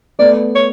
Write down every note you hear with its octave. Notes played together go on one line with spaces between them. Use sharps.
A3 B3 D5
C#5